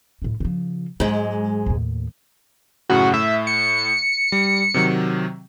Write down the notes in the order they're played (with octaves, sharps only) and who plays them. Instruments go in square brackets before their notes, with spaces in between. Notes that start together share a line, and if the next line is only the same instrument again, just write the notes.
[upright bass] D2 A2
C#3 F3
[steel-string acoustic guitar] G#2 G#3 [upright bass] F#3
[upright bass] D#2 A2
[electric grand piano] F#2 A2 C#3 [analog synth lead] F#4
[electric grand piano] A2 [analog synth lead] E5
[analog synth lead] C#7
[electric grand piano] G3
C3 D#3 F#3